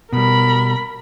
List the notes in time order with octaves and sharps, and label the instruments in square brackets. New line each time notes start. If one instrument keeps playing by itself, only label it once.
[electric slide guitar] B2 G3 [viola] A#4 B5